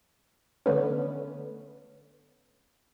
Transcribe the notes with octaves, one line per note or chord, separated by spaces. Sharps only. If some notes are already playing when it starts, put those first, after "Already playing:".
D3 A3 B3 C#4